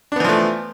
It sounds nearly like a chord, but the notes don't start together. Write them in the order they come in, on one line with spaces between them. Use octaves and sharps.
D4 B3 E3 F3 A3